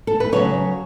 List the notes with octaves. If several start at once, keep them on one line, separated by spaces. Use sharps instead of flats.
A4
B4
C#3 F#3 C#4 C#5